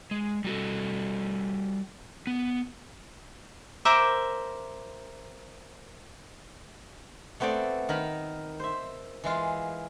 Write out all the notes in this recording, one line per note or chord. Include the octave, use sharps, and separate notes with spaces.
G#3
G3 F#4 A4
B3
A#4 C5 E5 D6
A3 B3 C4 C5 D5
D#3 A#4 B5
C5 E5
E3 G#3 F4